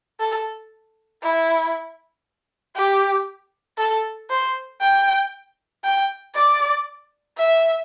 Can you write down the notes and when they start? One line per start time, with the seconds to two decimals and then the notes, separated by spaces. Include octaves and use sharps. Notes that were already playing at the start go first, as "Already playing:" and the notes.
0.20 A4
1.22 E4
2.76 G4
3.78 A4
4.30 C5
4.81 G5
5.84 G5
6.35 D5
7.38 E5